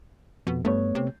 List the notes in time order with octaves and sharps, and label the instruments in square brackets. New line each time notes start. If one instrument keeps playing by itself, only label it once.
[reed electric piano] F2 [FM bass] B2
[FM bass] G2 [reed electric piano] A3 B3 C#5
[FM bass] C3